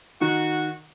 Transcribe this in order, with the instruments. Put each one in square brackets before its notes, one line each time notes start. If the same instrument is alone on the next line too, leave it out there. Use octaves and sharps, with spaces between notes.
[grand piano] D#3 [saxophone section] F#4